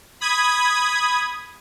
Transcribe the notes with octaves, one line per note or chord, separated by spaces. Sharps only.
B5 D#6 G#6